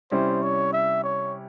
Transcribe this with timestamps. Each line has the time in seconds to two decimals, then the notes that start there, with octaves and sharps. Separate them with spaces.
0.11 C3 G3 C#4 E4 C5
0.42 C#5
0.73 E5
1.04 C#5